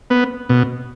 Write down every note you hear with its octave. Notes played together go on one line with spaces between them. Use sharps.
B3
B2